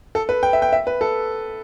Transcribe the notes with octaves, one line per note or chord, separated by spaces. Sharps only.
A4
B4
G5
E5
G5
E5
B4
A4